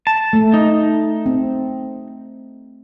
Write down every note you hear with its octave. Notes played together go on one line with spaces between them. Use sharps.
A5
A3
D#4
C4